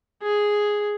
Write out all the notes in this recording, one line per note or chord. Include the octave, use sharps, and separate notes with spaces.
G#4